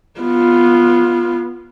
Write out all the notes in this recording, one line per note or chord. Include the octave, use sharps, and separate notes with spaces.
B3 F4